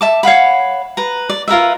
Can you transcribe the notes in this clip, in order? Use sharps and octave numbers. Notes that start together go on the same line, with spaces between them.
E5 A5 D6
C#5 F5 F#5 B5
B4 A#5
D5
F4 A#4 B4 E5